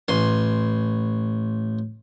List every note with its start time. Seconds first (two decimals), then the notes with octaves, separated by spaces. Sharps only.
0.08 A1 G#5 C6